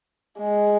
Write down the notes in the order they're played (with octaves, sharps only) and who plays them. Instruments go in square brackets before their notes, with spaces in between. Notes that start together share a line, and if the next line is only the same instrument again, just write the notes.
[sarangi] G#3